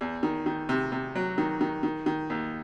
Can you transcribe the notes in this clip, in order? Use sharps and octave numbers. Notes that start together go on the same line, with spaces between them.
E2
D#3
D#3
C3
C3
F#3
D#3
D#3
D#3
D#3
D#2